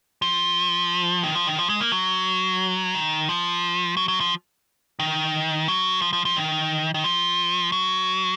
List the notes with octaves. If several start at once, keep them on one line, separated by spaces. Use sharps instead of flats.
F3
D#3
F3
D#3
F3
G#3
A#3
F#3
D#3
F3
F#3
F#3
F3
D#3
F#3
F3
F3
F3
D#3
D#3
F3
F#3